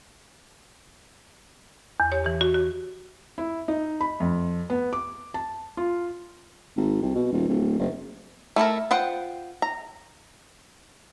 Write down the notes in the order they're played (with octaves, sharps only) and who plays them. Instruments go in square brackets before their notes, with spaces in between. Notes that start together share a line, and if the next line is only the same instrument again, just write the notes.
[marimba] E2
G4 C#5
E3 G4
F#4
F#4
[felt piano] E4
D#4
B5
F2
B3
D6
A5
F4
[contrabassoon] G#1
C2
B2
D#1
D1
F#1
[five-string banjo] A3 E4 A4 A#4
F4 C5 F#5 G5
A#5